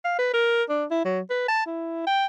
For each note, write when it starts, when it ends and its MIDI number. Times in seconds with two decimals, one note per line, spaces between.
0.05 0.16 77
0.19 0.31 71
0.34 0.63 70
0.69 0.85 62
0.91 1.01 64
1.05 1.20 54
1.30 1.47 71
1.48 1.65 81
1.66 2.02 64
2.07 2.26 79